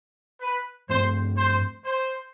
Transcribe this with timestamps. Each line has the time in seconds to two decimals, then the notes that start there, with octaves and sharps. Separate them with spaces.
0.42 B4
0.89 G2 F3 A3 C4 C5
1.38 C5
1.85 C5